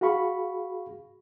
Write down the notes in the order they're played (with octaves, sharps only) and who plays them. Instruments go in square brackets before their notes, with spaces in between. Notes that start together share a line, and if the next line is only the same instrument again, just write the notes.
[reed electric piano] F#4 G#4 F5 B5 C#6